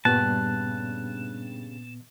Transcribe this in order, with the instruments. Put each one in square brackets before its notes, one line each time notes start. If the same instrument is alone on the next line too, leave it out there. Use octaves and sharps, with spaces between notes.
[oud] G2 C#3 G4 [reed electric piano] A#2 B3 [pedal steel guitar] A5 [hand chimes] F#6